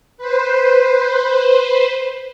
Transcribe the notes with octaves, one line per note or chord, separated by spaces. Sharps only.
B4 C5